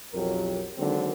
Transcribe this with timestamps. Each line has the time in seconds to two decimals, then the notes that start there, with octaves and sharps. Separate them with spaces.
0.13 B1 F2 F#3 G4 A#4
0.77 D3 D#3 F#3 G#3 A#3 C4